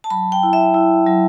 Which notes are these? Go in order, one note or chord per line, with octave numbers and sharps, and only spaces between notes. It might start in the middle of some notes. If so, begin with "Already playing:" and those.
A5
F#3 B5
G5
E4
E5
E4
F#3